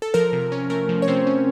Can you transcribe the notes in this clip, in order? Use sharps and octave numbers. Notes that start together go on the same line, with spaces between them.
A4
F3 A#4
C3
C#4
A3 A#4
F3
C#5
C3 C4 C5
C#4